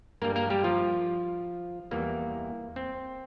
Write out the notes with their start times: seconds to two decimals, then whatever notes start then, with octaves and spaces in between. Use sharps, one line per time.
0.22 G2 G3 A#3 A#4
0.36 A#3 A#4
0.50 G3 G4
0.64 F3 F4
1.91 E2 E3 G3 A#3
2.76 C4